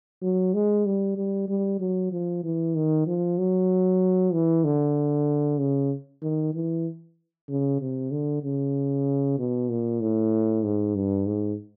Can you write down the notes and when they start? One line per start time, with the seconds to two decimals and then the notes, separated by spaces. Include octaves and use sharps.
0.23 F#3
0.54 G#3
0.86 G3
1.17 G3
1.49 G3
1.80 F#3
2.12 F3
2.44 E3
2.75 D#3
3.07 F3
3.38 F#3
4.33 E3
4.64 D3
5.59 C#3
6.22 D#3
6.54 E3
7.48 C#3
7.80 C3
8.11 D3
8.43 C#3
9.38 B2
9.69 A#2
10.01 A2
10.64 G#2
10.95 G2
11.27 G#2